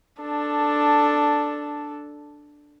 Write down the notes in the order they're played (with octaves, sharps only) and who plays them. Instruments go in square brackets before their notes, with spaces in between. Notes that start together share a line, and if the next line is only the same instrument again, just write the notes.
[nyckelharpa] D4 A4